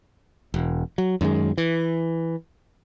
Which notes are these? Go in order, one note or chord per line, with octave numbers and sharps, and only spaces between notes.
E1
F#3
F#2 D#3 G3 G#3
E3